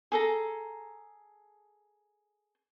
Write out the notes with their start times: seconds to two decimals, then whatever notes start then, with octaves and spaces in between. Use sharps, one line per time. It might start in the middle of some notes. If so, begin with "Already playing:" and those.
0.12 G#4 A4 A#5